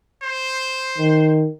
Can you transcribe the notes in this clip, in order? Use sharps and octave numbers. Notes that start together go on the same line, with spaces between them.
C5
D#3